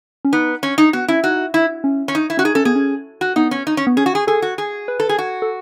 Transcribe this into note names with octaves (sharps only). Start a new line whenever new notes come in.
C#4
B3 D#4
C#4
D#4
B3 F#4
C#4 E4
D#4 F#4
E4
C#4
C#4
D#4
E4
C#4 F#4
D#4 G#4
C#4 A4
B3 G#4
C#4
F#4
B3 D#4
C#4
D#4
C#4
B3
C#4 G#4
F#4
G#4
G#4 A4
F#4
G#4
B4
A4
G#4
F#4
A4